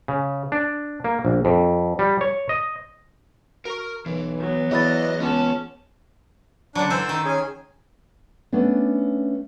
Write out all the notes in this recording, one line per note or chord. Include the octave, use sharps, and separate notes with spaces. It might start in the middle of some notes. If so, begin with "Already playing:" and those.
C#3
D4
A#3
A#1
F2
G3
C#5
D#5
F#4 A#4 C#6
B1 E3
F#3 B3
E2 E3 D#5 B5 A6
C#2 B3 C#4 A5
D3 F#3 D4
D3 E3 C5 E6
D#3
C#4 G#4 G#5
A3 B3 C#4 D4